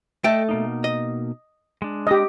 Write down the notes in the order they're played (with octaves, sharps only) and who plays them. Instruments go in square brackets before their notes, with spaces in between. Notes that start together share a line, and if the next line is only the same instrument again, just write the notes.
[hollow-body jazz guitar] A3 A4 [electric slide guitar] D#5 G5
[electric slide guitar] B2 A#3 D#4
[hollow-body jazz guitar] D#5
[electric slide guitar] G#3 D4
[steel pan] G4 D#5